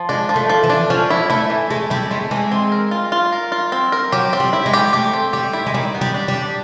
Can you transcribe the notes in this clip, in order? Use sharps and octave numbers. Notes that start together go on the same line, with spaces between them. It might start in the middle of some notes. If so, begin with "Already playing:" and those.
Already playing: F3
G#3 D4
F3
A3
F3
E3
D4
F3 C#4
E4
A3 E4
E3
G#3 A3
G3 E4
G#3 A3
E3 G#3
C4
A#4
F4
F4
A#4
F4
C4
A#4
F#3 G4
C4
G3
E4
G#3
G4
A3 G4
C4
G3 G4
E4
G#3
D#3 G3
B3
G3
D4
G3
D4